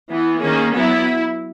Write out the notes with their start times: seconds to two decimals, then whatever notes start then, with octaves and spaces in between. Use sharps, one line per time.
0.09 E3 B3
0.41 D#3 A#3 C#4 G#4
0.73 F#3 B3 E4